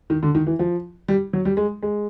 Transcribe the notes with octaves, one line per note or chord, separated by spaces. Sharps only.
D#3
D3
D#3
E3
F3
G3
F#3
G3
G#3
G#3